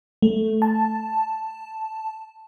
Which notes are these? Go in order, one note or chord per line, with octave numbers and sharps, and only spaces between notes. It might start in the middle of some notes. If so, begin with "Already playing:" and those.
A3
A5